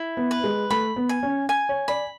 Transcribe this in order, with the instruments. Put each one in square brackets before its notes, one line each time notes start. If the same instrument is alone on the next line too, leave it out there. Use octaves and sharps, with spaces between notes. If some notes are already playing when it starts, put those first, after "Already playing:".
Already playing: [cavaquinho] E4
[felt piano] B3
[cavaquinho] B4
[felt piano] G#3
[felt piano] A3 [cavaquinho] B5
[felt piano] B3
[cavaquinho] G#5
[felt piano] C#4
[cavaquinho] G#5
[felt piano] C#5
[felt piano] D5 [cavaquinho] B5